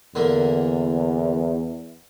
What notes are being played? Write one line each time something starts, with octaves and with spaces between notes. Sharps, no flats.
E2 D3 A#3